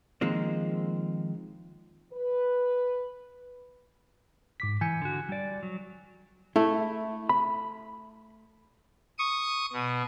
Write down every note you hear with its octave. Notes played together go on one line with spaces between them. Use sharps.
D#3 F3 G#3 A#3 C4
B4
G#2 D6 B6
E3 G#5 G6 C#7
D3 F#4
G3 D5
F#3
A3 E4
B5
C#6 D#6
B2